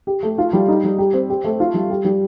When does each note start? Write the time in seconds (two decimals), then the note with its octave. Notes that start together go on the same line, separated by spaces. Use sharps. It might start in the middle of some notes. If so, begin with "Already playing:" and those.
0.07 G4
0.23 A3
0.38 F4
0.53 G3
0.68 D#4
0.84 G3
0.98 G4
1.14 C4
1.30 G4
1.44 A3
1.60 F4
1.74 G3
1.90 G4
2.04 G3